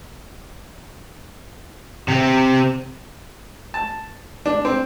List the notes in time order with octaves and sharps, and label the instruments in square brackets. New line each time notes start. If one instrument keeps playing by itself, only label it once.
[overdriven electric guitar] C3 C4
[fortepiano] A5
D4
C4